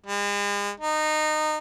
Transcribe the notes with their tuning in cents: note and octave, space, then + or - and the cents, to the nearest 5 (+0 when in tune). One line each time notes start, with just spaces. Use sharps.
G#3 -40
D#4 -20